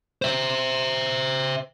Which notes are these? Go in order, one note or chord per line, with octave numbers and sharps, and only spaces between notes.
C5 E5